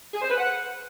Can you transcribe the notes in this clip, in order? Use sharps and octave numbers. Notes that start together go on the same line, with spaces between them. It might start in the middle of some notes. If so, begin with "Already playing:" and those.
G#4
C5
B4
F#5